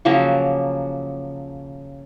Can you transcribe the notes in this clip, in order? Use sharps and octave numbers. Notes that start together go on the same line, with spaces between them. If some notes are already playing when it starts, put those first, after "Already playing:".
C#3 F3 F#3 A#3